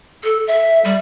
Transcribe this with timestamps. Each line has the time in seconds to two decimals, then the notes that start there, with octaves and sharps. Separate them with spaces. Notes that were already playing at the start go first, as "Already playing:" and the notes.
0.24 A4
0.47 E5
0.85 G3